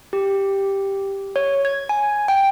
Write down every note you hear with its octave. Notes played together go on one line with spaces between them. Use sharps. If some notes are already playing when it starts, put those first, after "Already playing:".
G4
C#5
G#6
G#5
G5